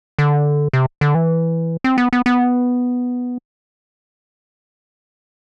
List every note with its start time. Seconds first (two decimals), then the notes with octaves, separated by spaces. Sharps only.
0.19 D3
0.73 C3
1.01 D3
1.15 E3
1.84 C4
1.98 B3
2.13 B3
2.26 B3